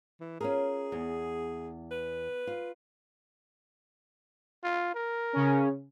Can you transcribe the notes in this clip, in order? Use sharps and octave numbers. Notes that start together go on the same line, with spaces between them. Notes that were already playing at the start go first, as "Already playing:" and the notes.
E3
C#4 F4 G#4 A#4
E2
B4
F4
F4
A#4
C#3 C#4